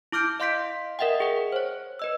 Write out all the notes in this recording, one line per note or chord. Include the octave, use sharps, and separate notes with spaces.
E4 D6 F6 G6 D7
D#5 F5 C6 G6 B6 D7
A#4 D#5 E5 F#5 G5
G#4 F#5
C5 C#5
B4 D#5 E6